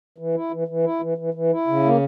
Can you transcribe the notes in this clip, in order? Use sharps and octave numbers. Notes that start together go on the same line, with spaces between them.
E3
E4
E3
E3
E4
E3
E3
E3
E4
C#3
A#3